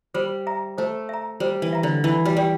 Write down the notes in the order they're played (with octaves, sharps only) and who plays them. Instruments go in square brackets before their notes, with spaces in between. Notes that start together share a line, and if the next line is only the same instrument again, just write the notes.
[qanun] G3 [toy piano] C5
[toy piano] E5 A#5
[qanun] A3 [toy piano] C5
[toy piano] E5 A#5
[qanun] G3 [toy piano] C5
[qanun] E3
[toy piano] E5 A#5
[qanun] D3
[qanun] E3 [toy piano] E4
[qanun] G3
[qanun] G3 [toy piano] G4 D5 G5